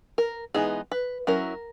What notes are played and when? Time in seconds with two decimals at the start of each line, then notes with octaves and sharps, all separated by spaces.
0.18 A#4
0.54 E3 G#3 B3 D#4 G#4
0.92 B4
1.27 F#3 C#4 E4 A#4